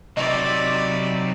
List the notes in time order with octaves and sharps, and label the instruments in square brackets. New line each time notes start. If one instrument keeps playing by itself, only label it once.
[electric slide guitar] C3 [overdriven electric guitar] F#3 D#4 [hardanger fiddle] D5 B5 [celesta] D#5